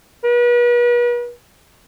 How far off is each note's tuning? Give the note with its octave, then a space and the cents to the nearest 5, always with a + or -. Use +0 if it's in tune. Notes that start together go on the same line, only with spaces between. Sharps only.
B4 -40